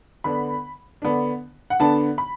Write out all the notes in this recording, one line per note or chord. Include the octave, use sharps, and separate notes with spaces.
D3 B3 D4 B5
D3 B3 D4
F#5
D3 B3 D4 A5
B5